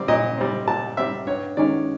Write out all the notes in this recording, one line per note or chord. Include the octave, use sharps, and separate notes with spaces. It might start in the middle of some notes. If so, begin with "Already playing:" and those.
Already playing: G3 C4 D5
A#2 D#5
G3 C4
A#2 A5
G3 C4 E5
G2 C#5
D#3 G#3 C#4 D5